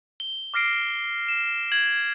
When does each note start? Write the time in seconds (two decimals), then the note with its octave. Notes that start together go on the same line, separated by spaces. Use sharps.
0.20 G7
0.54 D6 F6 A#6 C7 D7
1.28 E7
1.72 G#6 F#7